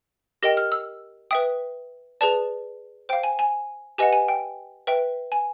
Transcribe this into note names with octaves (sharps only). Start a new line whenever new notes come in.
G4 A#4 D#5 G5 A#6
F6
E6
B4 E5 G5 D#6
G#4 B4 D5 A5
C5 F5 G5
G#5
G#5
G4 B4 D#5 F#5 G#5
G#5
G5
B4 E5 G5
G#5